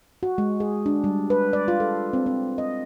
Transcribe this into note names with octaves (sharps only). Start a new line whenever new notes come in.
F#4
G#3
G#4
D4
G3
B4
D5
F4
A4
C4
C4
D#5